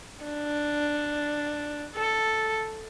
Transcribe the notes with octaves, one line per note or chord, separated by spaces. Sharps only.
D4
A4